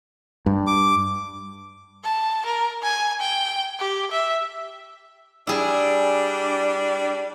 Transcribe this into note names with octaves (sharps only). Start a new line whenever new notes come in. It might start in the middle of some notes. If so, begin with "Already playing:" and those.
G2
D6
A5
A#4
G#5
G5
G4
E5
G3 D4 E4 G#4